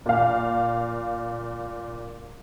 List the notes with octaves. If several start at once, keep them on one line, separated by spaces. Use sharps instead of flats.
A#2 F5